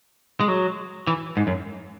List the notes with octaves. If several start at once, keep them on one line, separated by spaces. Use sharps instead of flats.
G#3
F#3
E3
G#2
F#2